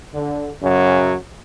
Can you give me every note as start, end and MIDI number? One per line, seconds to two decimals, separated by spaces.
0.14 0.52 50
0.63 1.14 42
0.63 1.14 49
0.63 1.14 54